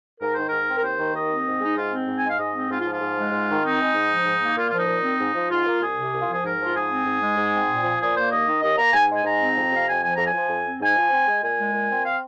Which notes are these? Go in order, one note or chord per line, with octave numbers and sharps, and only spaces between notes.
G#2 A#4
D#3 C5
G#2 A#4
C4
A#4
D#2 C5
D#3
D#2 D#5
C4
G#2
G#3 D#4
G#2 F4
C4
G#2
G#5
G#3 F5
G#2 D#5
C4
G#2 F4
F4
F3
F4
G#2
G#3
G#2
D#3
C4 D#4
G#3
G#2
F3
G#2
A#3
A#2 F4
F4
F3 D#4
A#2
C4
G#2
F3
G#2 F4
A#3
C2 G#4
C3
C2
F4
F3 G#4
G#2 A#4
F3
F4
G#2 G#4
C4
G#2
G#3
G#2
C4
A#2
F3
A#2 G#4
A#3 C5
D#2 D#5
D#3
D#2 D#5
A#3 A#5
G#2 G#5
G#3
G#5
G#2 A#5
C4
F2
C3 F5
F2 G#5
F3 G#5
F2 A#5
G#5
F3
F2
C4
G#2 G#5
F3
C4
G#3
A#2 G#5
G#3
A#2
C4
F5